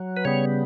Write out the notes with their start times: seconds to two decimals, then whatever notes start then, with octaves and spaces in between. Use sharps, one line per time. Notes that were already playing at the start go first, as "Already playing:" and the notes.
Already playing: F#3
0.17 B4
0.25 C#3 G3 B3 C#5